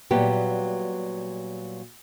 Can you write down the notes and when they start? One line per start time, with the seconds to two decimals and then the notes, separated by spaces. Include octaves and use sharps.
0.11 A#2 F#3 G3 B3 G4